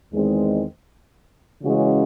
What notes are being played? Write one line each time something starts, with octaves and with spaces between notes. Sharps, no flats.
E2 D#3 G#3 C4
C#3 E3 G#3 C#4 F#4